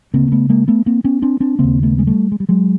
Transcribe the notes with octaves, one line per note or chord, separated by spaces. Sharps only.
D2 C#3 A#3 C4
A3 B3
G#3 A#3
A3 B3
A#3 C4
B3 C#4
C4 D4
C4 D4
D#2 C#3 A#3 C4
A3 B3
G#3
G3 A3
G#3
G3
F#3 G#3